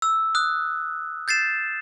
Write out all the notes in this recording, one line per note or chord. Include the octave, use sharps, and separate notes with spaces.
E6
D#6 F#6
G6 A6 C7 E7